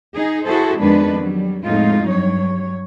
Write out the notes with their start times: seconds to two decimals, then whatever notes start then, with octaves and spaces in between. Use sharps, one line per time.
0.15 D#4 G#4
0.46 E4 F#4 G#4 A4 C5
0.81 F2 D#3 G#3 B3 D4 B4
1.20 F#3 G3
1.65 F2 A2 G#3 D#4 F4
2.07 G2 F#3 C#5